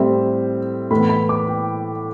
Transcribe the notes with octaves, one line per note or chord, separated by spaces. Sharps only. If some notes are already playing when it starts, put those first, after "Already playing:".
Already playing: A2 G3 C4 E5
A2 E3 B3 B5
B5
D6
G5